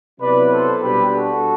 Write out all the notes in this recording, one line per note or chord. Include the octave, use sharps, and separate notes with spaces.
C3 F#3 B3 E4 B4 D5
A4 C5
B2 G3 D4 G4 B4
F#4 A4